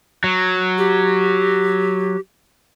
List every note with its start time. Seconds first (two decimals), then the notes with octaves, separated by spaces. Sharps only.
0.24 F#3
0.78 G4